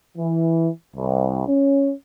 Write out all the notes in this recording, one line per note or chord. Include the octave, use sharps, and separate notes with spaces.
E3
C2
C#4